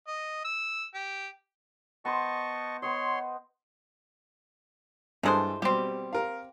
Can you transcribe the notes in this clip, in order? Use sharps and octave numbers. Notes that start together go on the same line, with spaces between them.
D#5
E6
G4
B3 C5 D#5 A5 C#6
B3 C5 C#5 D#5 C6
G2 E3 G#3 A4 C5
B2 G3 C4 G4
A#4 F5